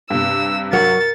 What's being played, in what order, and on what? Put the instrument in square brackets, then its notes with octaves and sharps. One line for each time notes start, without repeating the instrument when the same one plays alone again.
[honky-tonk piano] G2 C3 [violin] E6
[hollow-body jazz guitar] F#3 F#4 [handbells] A#4 C#7 [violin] A6